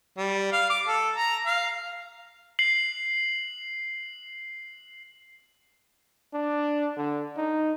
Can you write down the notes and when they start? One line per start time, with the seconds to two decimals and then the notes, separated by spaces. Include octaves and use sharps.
0.18 G3
0.52 F5
0.70 D6
0.87 A4
1.15 A#5
1.46 F5
2.59 C7 F#7
6.34 D4
6.97 D3
7.37 D#4